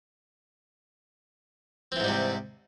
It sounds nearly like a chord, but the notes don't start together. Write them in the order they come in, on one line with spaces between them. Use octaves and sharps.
C4 E3 G#2 G3 C3